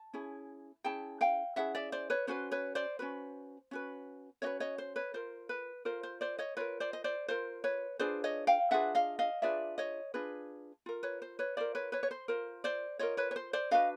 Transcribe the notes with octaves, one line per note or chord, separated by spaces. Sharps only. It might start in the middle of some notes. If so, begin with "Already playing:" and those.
Already playing: A5
C#4 E4 G#4
C#4 E4 G#4 G5 A5
F5 G5
C#4 E4 G#4 E5 F#5
D5 E5
C5 D5
B4 C#5
C#4 F#4 B4 C5
B4 C#5
C5 D5
C#4 F#4 B4
C#4 F#4 B4
C#4 F#4 B4 C#5 D#5
C#5 D#5
C5
B4 C#5
F4 A#4 C5
B4
F4 A#4 C5
C5
C5 D5
C#5 D#5
F4 A#4 B4 C#5
C5 D5
D#5
C5 D5
F4 A#4 C5
B4 C#5
D4 F4 G#4 B4 C5 D5
C#5 D#5
F5 G5
D4 F4 G#4 B4 E5 F#5
D#5 F5
D#5 F5
D4 F4 G#4 B4 D5 E5
C#5 D#5
D4 F4 G#4 B4
F4 A#4
B4 C#5
C5
B4 C#5
F4 A#4 C5 D5
B4 C#5
B4 C#5
C#5
C5
F4 A#4 C5
C5 D5
F4 A#4 C#5 D#5
B4 C#5
C#5
C5
C5 D5
D4 F#4 B4 D#5 F5